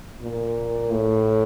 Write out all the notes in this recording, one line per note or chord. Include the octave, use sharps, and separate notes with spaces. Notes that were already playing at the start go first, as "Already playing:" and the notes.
A#2
A2